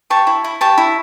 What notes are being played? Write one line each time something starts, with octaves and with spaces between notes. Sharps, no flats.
G4 A5 C#6
E4
E4
G4 A5 C#6
E4